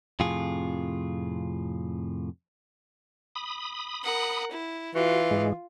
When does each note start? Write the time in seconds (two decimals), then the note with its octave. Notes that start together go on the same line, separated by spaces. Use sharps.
0.20 F2 A2 C3 F4 G#4
3.35 B5 D#6
4.03 A#4 F#5
4.51 E4
4.95 E3 F4 F#4
5.31 G#2 G#3